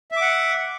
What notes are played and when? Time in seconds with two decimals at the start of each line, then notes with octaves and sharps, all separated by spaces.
0.12 E5
0.16 D6
0.21 F#5